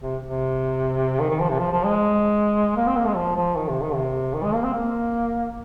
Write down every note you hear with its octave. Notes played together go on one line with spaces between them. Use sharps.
C3
C3
D#3
D#3
F3
C3
F3
F3
G#3
A#3
C4
A#3
G#3
F3
F3
D#3
C3
D#3
C3
D#3
G#3
A#3
C4
A#3